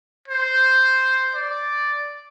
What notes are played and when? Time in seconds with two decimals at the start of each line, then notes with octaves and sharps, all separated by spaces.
0.28 C5
1.35 D5